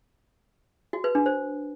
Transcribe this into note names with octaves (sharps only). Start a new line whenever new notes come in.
F#4
B4
D4
C5